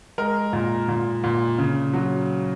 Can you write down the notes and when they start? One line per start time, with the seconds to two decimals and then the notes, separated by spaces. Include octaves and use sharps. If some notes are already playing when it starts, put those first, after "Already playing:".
0.18 G#3 A#4
0.53 A#2
0.88 A#2
1.24 A#2
1.58 C#3
1.93 F#3